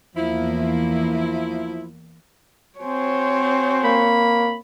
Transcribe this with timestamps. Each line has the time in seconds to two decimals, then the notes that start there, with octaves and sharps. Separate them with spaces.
0.16 E2 F3 A#3 E4
2.79 C4 F#4 C5 C#5 G#5
3.84 A#3 B5